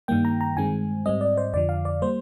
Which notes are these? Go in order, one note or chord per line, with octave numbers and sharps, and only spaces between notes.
G2 D#3 G3 A#3 G5
A#5
A#5
G2 D#3 G#3 C4 G#5
G#2 G3 C4 D#5
D5
C5
F2 D3 F3 D5
F5
D5
G3 A#3 C5